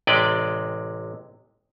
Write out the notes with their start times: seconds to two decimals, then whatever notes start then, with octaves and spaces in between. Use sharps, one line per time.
0.07 A1 C3 G#3 B4 D5 G5